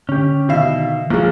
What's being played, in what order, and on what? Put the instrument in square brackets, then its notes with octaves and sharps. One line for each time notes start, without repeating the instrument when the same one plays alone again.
[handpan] D3 [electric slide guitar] C#4 G4
[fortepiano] B2 F5 [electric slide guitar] D#3 E5
[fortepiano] A#1 [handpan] A#3 G#4